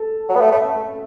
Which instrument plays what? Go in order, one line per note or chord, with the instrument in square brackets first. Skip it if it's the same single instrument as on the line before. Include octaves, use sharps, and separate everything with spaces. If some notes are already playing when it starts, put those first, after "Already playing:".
Already playing: [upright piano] A4
[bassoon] F#3
B3
A3
[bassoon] A3 [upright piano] E5